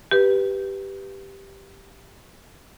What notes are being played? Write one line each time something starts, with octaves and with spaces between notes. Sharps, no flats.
G4 B4